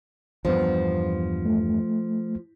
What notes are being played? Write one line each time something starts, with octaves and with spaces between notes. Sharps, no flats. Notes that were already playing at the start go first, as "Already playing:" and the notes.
E2 G2 F3 B3
A3